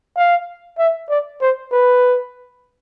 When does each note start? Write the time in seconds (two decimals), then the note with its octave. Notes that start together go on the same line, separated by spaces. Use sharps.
0.17 F5
0.78 E5
1.09 D5
1.41 C5
1.72 B4